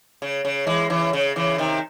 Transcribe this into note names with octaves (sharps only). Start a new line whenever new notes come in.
C#3
C#3
E3 G#3
C#3 E3
C#3
C#3 E3
C3 D#3